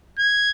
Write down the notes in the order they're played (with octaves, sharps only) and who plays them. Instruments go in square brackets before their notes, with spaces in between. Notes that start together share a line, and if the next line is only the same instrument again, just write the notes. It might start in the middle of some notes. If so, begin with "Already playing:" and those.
[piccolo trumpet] G#6